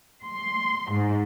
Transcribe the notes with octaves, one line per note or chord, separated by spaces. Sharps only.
C6
G#2